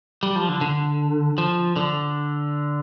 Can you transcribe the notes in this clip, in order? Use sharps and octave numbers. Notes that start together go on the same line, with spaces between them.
G3
F3
D3
D3
F3
D3